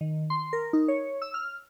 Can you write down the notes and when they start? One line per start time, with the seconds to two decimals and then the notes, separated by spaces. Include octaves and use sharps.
0.01 D#3
0.30 C6
0.53 A#4
0.73 D#4
0.88 C#5
1.22 E6
1.34 F6